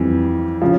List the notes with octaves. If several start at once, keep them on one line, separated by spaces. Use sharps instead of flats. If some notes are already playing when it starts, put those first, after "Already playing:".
Already playing: F2 E3 G3
C#3 F3